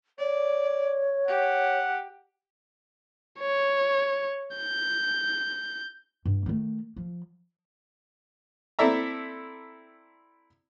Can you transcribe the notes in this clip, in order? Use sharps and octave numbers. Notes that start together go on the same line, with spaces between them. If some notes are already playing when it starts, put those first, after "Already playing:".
C#5 D5
G4 F#5
C#5
G6
G2
D#3 A3
F3
C4 E4 A4 D5 E5 A#5